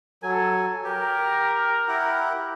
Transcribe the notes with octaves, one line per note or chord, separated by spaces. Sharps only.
F#3 A4 G#5
G4 A#4
E4 G4 F#5